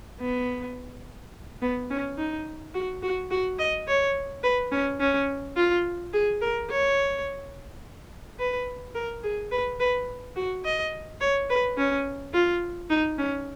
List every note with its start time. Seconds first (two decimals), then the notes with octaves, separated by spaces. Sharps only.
0.21 B3
1.62 B3
1.90 C#4
2.18 D#4
2.74 F#4
3.03 F#4
3.31 F#4
3.59 D#5
3.88 C#5
4.43 B4
4.71 C#4
5.00 C#4
5.56 F4
6.13 G#4
6.41 A#4
6.70 C#5
8.39 B4
8.95 A#4
9.23 G#4
9.51 B4
9.80 B4
10.36 F#4
10.65 D#5
11.21 C#5
11.50 B4
11.77 C#4
12.34 F4
12.90 D#4
13.18 C#4